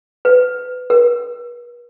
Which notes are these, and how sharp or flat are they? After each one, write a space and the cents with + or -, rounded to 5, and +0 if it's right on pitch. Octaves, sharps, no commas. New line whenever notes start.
B4 +20
B4 -45